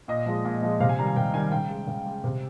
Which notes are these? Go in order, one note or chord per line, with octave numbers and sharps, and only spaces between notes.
A#2 D#5
F3 G#3
A#2
F3 G#3
C3 F5
G#5
D#3 G3 A#5
G#5
C3 G5
D#3 G3 G#5
C#3 G5
G#3
C#3
G#3
C3